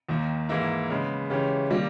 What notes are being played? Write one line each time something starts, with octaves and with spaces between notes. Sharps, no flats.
D#2 D#3 A#3
G#2 E3 A#3 E4
C#3 G#3 B3
C#3 E3 G#3 C#4 G4
D#3 G3 A#3